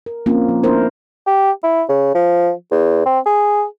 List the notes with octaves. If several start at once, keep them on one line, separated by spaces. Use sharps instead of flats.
A#4
F3 A#3 C4 C#4 F4
F3
B3 D4 E4 A#4 C5
G4
E4
C#3
F3
E2
C4
G#4